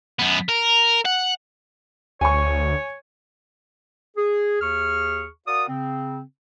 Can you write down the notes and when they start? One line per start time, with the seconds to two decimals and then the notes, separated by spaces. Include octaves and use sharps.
0.19 F#2 B3
0.49 A#4
1.05 F#5
2.21 D2 C#5 G#5 C#6
4.17 G#4
4.61 D#2 G#4 C#6 F6
5.47 F#4 A#4 D5 F5 F#5 D#6
5.69 C#3 C4